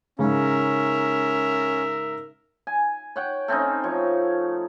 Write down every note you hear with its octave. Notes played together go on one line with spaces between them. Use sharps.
G#2 C#3 C#4 A#4 E5
G#5
C#5 F#5 G5
A3 C4 C#4 D#4
F3 C#5